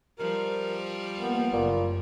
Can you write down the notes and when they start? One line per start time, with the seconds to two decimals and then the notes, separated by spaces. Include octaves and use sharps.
0.19 F3 G3 G4 A#4
1.19 A#3 B3
1.53 F#1 A#2